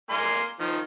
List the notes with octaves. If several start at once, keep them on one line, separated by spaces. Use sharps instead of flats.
A#3 G#5 C6
D#3 F3